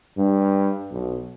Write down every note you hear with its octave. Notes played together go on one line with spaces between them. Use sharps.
G2
B1